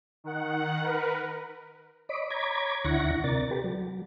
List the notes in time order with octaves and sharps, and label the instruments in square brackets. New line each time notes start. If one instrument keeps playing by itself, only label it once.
[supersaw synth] D#3 F#5
A#4 B4
[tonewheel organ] C#5 D#5 B5 D6
C#5 A#5 B5 D6 G#6
D2 D3 E4 F#5 C#6 A#6
C3 A#4 D5 A6
G4 A4 B4
F#3